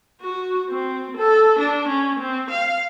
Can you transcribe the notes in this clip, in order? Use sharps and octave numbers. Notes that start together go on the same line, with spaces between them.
F#4
C4
A4
D4
C#4
C4
F5